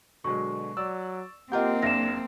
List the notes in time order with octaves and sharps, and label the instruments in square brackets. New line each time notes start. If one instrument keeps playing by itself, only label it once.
[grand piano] B2 F#3 G#3 [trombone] D3 [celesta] C#6
[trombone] F#3 [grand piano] D5 E6
[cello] A#3 C4 [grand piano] F4 A#4 G6 [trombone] G4 [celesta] D#5 F#5
[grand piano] F#1 E5 F5 [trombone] D4 [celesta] A#6 E7